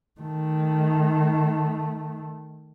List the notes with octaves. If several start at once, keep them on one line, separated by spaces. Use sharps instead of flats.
D#3 A3